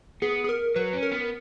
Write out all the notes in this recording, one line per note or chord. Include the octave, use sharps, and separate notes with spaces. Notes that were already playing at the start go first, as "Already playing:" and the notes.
B3 G#4
G#4
A#4
F#3 B4
C#4
A#4
B3